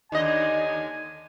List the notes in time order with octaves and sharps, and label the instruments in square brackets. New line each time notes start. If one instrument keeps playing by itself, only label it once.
[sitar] D#2 D3 D#5 [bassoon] D#4 [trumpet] G#5